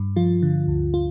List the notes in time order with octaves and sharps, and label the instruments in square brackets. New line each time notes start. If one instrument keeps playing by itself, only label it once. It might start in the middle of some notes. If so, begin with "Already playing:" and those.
Already playing: [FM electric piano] G2
F3 F4
D3
D2
F4